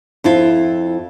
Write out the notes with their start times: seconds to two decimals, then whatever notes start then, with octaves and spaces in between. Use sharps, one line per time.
0.24 F2 E4 F4